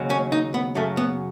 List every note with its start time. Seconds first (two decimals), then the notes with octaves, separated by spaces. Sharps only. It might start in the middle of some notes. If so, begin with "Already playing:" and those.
Already playing: D#2 C#3 F#3
0.10 C#4
0.32 D#4
0.54 B3
0.75 F#2 C#3 F#3 A3
0.97 B3